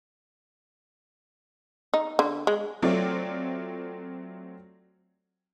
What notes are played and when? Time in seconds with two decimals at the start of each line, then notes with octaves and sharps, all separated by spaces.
1.94 D#4
2.19 D3
2.47 G#3
2.82 F#3 A3 C4 F4 C#5 D5